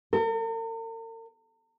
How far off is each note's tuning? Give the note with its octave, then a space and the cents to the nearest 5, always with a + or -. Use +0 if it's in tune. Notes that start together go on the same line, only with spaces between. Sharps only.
A#4 -45